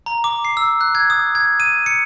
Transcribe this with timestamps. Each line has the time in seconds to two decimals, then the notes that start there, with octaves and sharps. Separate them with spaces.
0.06 A#5
0.24 D6
0.45 C7
0.57 E6
0.81 F#6
0.95 G#6
1.10 D#6
1.35 G#6
1.60 D#7
1.86 C#7